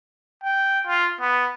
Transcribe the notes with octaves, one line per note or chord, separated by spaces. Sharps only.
G5
F4
B3